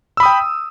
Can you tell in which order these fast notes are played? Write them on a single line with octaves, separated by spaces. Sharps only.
E6 B5 D#6 G5